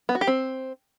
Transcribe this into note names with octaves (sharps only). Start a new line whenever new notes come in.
B3
F#4
G4
C4